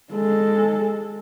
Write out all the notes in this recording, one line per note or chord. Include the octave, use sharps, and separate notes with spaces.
G#3 A4